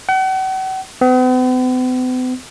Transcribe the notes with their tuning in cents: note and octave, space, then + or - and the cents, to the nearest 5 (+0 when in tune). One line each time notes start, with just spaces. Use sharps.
F#5 +40
B3 +45